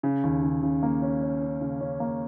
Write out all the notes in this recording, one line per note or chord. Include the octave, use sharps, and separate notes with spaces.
C#3
D#2
C#3
C#3
A#3
C#4
C#4
C#4
C#3
C#4
A#3